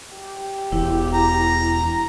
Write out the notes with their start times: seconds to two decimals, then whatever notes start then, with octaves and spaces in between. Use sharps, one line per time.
0.14 G4
0.72 E1 E4
1.13 A#5